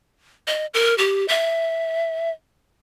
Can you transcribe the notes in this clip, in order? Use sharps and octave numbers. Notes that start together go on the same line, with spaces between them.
D#5
A#4
G4
E5